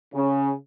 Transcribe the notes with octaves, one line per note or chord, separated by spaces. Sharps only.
C#3